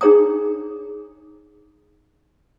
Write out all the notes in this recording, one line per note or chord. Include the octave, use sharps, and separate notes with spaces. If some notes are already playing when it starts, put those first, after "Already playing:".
D4 D#4 G#4 C#5 A#5 D#6